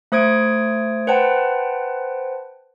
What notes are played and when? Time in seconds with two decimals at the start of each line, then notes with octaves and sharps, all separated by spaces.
0.12 A3 C5 D#6 G#6 D7
1.07 B4 C5 F#5 G5 A5